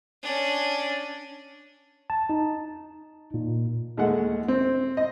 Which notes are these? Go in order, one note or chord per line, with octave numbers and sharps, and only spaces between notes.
C#4 D4
A5
D#4
A#2
D#2 G#3 A3 F#5
C4
D#5